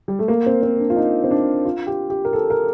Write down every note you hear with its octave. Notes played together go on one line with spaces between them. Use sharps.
G3
A3
A#3
C4
C4
D4
F4
D#4
C4
D4
F4
G4
G4
A#4
A4
A#4